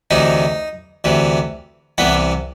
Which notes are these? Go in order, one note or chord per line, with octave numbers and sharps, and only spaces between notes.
D2 C3 E3 D#4
D2 C3 E3
C2 C3 E3 B3